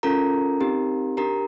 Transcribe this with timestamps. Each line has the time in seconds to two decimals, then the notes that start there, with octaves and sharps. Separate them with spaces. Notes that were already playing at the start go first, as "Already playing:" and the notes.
0.03 C#4 F4 A4 A#4 A#5
0.60 C4 D#4 G4
1.17 D4 G4 A#4 A#5